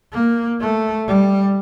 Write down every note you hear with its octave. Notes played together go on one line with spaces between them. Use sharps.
A#3
A3
G3